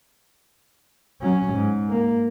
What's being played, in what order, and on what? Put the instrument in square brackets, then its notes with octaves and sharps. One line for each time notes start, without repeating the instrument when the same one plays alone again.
[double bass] F#3 C#4
G#2
A#3